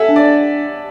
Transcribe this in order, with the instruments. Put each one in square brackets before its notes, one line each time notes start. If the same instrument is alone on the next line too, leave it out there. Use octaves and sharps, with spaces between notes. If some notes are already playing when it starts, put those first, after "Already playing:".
Already playing: [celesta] A4 [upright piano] E5 F#5 G#5 A5
[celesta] D4
[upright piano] D5
[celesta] D4